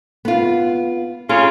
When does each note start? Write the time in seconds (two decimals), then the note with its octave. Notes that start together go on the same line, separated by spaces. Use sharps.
0.25 B3 F4
1.29 C#3 F4 G#4